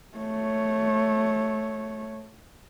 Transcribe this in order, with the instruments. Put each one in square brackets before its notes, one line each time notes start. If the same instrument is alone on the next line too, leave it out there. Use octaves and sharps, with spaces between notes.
[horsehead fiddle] A3 C#5